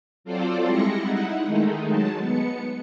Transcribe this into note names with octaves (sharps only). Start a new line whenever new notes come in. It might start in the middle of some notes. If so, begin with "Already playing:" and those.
F#3 C4 F4 A4 C5 D5
G3 G#3 C4 E4 A#6 C#7
D#4 E4 F#5
D#3 G#3 A3 D#4
F#3 G#3 A5
B3 C#7